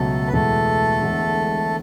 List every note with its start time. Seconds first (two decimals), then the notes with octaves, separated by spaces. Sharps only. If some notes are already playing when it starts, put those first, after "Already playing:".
Already playing: C#2 B2 F#3 A3 A4
0.28 B4
0.32 E2 B2 G#3 A3 B3 A4
1.02 E1 E2 D3 G#3